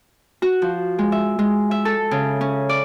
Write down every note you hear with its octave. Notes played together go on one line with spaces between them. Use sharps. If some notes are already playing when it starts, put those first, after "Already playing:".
F#4
F3
G#3
E5
G#3
E5
A4
C#3
C#4
D5